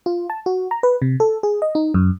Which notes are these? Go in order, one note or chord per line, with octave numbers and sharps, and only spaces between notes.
F4
A5
F#4
A#5
B4
C3
A4
G#4
D#5
D#4
F#2